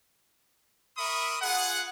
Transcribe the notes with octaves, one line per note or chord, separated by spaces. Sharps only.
A#4 E5 B5 C#6 D#6
F4 G#4 F#5